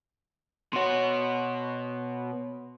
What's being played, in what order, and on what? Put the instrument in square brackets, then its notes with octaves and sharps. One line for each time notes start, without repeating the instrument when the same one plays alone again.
[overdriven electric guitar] B2 F#4 [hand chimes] C#5 C6